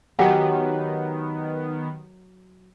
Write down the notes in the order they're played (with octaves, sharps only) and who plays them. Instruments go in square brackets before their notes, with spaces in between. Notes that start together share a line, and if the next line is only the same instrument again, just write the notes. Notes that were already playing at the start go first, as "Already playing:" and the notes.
[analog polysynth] D#3 B3 [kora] F#3 [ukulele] G4 D#5 G#5